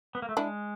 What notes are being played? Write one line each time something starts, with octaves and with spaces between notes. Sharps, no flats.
B3
A#3
A3
G#3 D4 E4